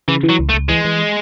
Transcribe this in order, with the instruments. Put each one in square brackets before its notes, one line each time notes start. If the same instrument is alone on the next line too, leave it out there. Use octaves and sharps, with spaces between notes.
[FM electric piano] C#3 [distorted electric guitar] E3
[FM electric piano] E3
[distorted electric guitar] F#3
[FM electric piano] C#2
[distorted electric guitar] A3
[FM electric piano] C#2
[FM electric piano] E3 [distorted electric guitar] G#3
[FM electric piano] E3